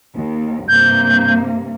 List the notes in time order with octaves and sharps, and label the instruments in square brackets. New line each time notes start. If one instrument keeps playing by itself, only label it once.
[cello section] D#2
[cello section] G2 C3 A#3 [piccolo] G6